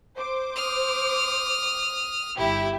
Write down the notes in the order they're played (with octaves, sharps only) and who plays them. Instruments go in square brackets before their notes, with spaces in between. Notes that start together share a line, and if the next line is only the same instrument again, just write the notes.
[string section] C5 D6
[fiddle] D#6 F6
[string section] G1 G4 E5 [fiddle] E4